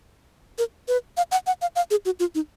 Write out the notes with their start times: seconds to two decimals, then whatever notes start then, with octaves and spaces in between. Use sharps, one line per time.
0.58 A#4
0.88 B4
1.17 F5
1.32 F#5
1.47 F#5
1.62 F5
1.76 F5
1.91 G#4
2.05 F#4
2.20 F4
2.35 D#4